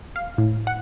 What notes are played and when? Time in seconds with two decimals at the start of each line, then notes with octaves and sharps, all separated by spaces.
0.16 F5
0.38 A2
0.67 F#5